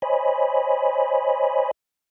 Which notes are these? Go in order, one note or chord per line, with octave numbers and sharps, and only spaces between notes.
C5 C#5 D#5 G#5 B5